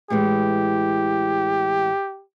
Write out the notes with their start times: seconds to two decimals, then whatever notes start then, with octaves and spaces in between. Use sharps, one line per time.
0.10 A2 E3 G#3 G4